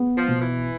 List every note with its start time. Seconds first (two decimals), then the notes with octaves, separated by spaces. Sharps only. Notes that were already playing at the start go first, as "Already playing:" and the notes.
Already playing: B3
0.17 F3
0.28 B2
0.41 E3